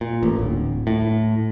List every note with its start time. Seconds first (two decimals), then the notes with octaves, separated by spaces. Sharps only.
0.01 A#2
0.23 A1
0.39 D1
0.87 A2